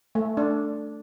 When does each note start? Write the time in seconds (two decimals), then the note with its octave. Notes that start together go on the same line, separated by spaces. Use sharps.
0.15 A3
0.37 D4